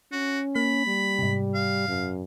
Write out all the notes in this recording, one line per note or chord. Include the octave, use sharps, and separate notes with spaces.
C#4 F#4
A#3 B5
G3
G#2 C3
F5
F#2